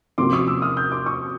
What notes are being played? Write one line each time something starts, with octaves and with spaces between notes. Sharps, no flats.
C3 F3 A#3 C#4 F#4 C6 D6
C#6 D#6
D6 E6
D#6 F6
F6 G6
C6 D6
C#6 D#6